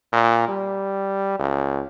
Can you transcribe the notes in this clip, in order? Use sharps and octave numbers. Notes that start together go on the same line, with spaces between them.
A#2
G3
C#2